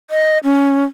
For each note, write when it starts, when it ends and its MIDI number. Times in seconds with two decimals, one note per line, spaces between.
0.10 0.38 75
0.44 0.84 61